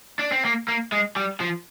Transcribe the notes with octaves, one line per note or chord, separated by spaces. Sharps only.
D4
C4
A#3
A#3
G#3
G3
F3